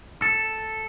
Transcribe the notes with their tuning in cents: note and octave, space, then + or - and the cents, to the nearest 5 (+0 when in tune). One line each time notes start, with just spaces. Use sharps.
A4 +0